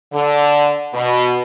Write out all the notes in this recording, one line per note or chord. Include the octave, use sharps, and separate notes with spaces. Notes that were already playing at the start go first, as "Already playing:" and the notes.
D3
B2